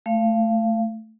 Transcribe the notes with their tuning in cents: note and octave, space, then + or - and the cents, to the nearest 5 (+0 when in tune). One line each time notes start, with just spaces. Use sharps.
A3 +0 F5 -25